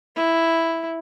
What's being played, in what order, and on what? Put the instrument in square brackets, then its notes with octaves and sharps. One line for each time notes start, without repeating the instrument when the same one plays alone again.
[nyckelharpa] E4